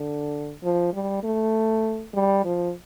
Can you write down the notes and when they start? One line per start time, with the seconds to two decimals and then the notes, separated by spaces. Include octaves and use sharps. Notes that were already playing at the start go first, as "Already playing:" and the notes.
Already playing: D3
0.63 F3
0.93 G3
1.23 A3
2.14 G3
2.44 F3